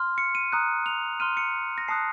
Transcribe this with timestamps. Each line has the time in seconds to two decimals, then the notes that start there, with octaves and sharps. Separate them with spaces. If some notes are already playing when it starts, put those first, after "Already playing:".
Already playing: C6 F6
0.18 C#7
0.35 D#7
0.52 A#5 D#6 F#6
0.86 F7
1.20 C6 F6 D#7
1.37 C#7
1.78 A#6
1.88 A5 D#6 F#6 C7